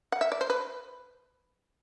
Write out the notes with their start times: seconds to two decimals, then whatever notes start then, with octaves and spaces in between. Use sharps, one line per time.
0.12 F#5
0.21 E5
0.32 D5
0.41 C5
0.50 B4